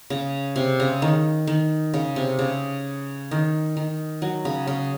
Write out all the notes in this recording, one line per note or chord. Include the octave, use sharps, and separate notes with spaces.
C#3
C3
C#3
D#3
D#3
C#3
C3
C#3
D#3
D#3
F#3
C#3
C#3